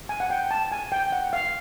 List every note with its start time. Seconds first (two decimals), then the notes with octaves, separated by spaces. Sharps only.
0.09 G#5
0.20 F#5
0.30 G5
0.51 A5
0.72 G#5
0.92 G5
1.12 F#5
1.33 F5